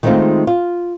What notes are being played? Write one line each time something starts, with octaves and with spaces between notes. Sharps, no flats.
D#3 G#3 A3 C4 D#4 F4
F4